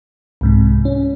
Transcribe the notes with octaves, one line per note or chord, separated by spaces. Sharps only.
C2 G#2 C3
C#4